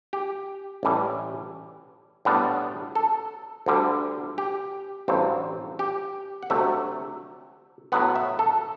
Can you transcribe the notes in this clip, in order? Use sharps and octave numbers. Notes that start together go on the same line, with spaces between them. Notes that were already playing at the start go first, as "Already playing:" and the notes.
G4
A1 A2 E3 G3
A2 G3 B3 D4
A4
D2 D3 G3
G4
A1 G2 F#3 C4
G4
F#5
D2 C3 F#3 A3 E5
A2 F#3 B3 F#5
E5
A4